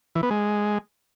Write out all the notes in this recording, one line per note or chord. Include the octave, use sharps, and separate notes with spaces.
E3
B3
G#3